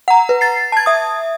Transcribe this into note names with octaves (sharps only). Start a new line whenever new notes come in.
F#5 A#5
B4
A6 C7
A5 G#6
E5 D#6